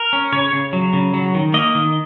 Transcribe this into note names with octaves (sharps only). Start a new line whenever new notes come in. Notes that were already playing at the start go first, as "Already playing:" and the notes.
Already playing: A#4
C#4
C#3 C#5
C#3
F#3
C#3
F#3
D#3
A#3 D#5
D#3